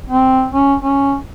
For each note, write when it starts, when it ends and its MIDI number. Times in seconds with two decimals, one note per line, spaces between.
0.10 0.47 60
0.52 0.75 61
0.81 1.15 61